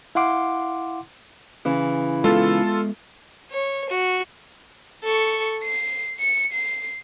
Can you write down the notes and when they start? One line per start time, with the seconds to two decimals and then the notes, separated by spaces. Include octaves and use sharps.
0.15 E4 F5 F#5 C6 D6
1.65 C#3 E3
2.24 G#3 B3 F4 A4
3.51 C#5
3.89 F#4
5.03 A4 C#6
5.64 C7
6.19 C#7
6.53 C7